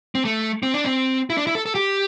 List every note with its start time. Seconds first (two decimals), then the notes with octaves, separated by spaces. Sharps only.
0.15 C4
0.25 A3
0.63 C4
0.74 D4
0.84 C4
1.30 E4
1.37 D4
1.47 E4
1.55 A4
1.66 A4
1.75 G4